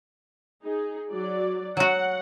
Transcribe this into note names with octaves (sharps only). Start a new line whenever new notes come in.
D#4 G#4
F#3 D5
F#3 F#4 F#5